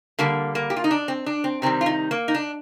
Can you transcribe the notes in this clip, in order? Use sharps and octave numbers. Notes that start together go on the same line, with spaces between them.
D3 G3 A#3
A#3
G4
F4
D#4
D4
C4
D4
C4
C3 D#3 G3 C4
F4
D#4
A#3
D#4
D4